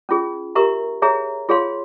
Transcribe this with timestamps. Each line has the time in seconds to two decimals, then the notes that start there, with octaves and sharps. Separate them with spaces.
0.09 C#4 F4 G#4
0.55 G4 A#4 E5 A#5 C#6
1.02 G#4 C#5 E5 A#5
1.49 F4 G#4 C#5 F5 C6